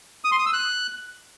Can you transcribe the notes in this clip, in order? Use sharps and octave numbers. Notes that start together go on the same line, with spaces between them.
D#6
C6
D#6
E6
F#6